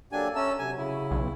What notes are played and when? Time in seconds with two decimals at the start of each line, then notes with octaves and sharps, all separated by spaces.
0.12 F#3 A#3 D4 G4 A4 G#5
0.36 C#4 E5 A5 A#5 E6
0.59 C3 F#3 G#5
0.78 C#3 E4
1.11 B1